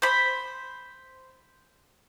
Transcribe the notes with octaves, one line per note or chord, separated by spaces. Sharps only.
C5 B5